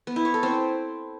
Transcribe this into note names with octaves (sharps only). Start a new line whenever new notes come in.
B3
E4
C#5
A4
C4